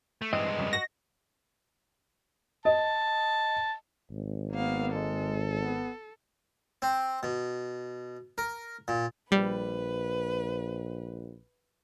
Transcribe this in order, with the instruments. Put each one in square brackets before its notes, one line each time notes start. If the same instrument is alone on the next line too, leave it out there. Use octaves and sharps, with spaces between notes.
[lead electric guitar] A3
[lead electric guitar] G2 G#3 [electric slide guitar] E3 C4 [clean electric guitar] D#5
[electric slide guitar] F2 C#3 G3
[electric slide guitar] F#4 [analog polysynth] A#6
[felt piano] D#5 [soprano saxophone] A5
[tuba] G#1
[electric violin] A#3 F5 [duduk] B3
[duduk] G#3 [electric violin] A4
[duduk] B3
[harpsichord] C4
B2
A#4
A#2
[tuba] A#1 [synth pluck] G3 [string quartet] B4